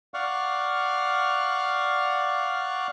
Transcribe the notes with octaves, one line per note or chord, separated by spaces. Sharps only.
D5 F5 F#5 C#6 F6